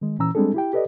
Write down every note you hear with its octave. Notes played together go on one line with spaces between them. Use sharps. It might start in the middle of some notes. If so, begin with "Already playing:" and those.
D#3 G#3
A#2 E3 C#4 A#5 E6
G3 G#3 C4 D4 G#4 A4
E4 G4 G5
G4 A4 B4 D5 D#5